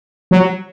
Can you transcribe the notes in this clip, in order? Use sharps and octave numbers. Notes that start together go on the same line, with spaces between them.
F#3